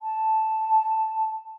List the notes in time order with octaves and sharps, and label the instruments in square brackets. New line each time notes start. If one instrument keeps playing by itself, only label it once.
[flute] A5